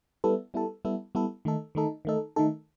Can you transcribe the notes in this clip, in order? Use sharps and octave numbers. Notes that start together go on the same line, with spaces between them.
G3 B3 E4 A4
G3 B3 E4 A4
G3 B3 E4 A4
G3 B3 E4 A4
D#3 A3 D#4 A4
D#3 A3 D#4 A4
D#3 A3 D#4 A4
D#3 A3 D#4 A4